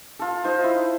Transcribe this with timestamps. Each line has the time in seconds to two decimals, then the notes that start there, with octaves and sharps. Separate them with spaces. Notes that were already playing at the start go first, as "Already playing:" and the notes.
0.19 F4 A4
0.44 D#4 F4 C5
0.64 E4